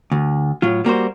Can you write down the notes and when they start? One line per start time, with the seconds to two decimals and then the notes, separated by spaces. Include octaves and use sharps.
0.11 D2
0.62 A2 F#3 F4
0.85 G3 A#3 F#4 C5